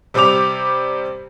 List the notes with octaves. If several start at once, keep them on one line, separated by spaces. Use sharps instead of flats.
C3 G3 C4 G4 D6 F7